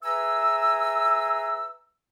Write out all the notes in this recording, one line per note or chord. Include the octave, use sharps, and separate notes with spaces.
G#4 B4 E5 G#5 A#5 E6